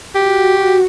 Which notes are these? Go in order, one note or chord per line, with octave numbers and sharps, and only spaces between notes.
F#4 G4